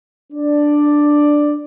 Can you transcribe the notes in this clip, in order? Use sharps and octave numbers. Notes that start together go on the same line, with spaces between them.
D4 D5